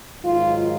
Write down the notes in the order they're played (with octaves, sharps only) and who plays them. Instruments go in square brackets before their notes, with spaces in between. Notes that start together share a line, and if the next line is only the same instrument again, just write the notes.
[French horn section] G#2 D#3 F#3 F4